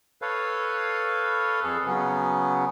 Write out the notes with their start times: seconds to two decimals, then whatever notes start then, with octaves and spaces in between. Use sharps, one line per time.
0.22 A4 B4 C#5 F5
1.63 F2 G#4 A4
1.87 C#3 F#3 B3 C#4